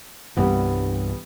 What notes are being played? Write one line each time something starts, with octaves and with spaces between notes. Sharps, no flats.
C2 G2 E3 G3 B3